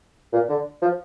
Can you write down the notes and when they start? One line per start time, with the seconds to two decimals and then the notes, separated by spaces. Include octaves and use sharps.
0.33 A#2
0.49 D3
0.82 F3